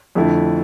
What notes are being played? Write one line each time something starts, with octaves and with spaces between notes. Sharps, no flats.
F2 D3 A3 E4